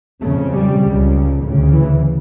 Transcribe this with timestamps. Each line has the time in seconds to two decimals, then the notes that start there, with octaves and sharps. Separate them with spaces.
0.21 C#3 A3
0.26 F2
0.52 G3
0.82 C#2 C#3
1.42 D2 F3
1.47 C#3
1.72 E3